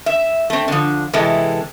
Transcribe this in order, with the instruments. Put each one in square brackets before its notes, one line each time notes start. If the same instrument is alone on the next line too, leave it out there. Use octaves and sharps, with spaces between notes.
[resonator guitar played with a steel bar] E5
A3 C4
D3 F3
C3 E3 G#3 A4